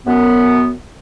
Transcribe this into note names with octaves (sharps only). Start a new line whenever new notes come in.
F#2 B3